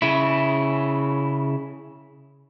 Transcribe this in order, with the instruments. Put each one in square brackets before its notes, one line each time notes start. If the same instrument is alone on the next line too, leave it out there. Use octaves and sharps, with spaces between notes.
[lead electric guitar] C#3 E4